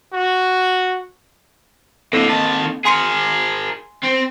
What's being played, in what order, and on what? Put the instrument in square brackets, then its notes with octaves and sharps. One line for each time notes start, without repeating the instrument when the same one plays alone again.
[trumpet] F#4
[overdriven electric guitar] A2 D3 [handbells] A#3 C4 A4
[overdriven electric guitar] D#3 A5
[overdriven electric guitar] G#4 A#4 [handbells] G#5 C6 C#7
[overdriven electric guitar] C4